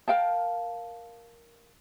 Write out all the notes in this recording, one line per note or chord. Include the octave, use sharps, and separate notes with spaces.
A#4 F5 G5 A5